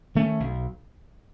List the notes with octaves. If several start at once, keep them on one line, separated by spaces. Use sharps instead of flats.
D#3 A3 C#4
B1